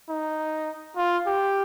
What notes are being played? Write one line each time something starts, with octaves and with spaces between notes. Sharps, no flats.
D#4
F4
G4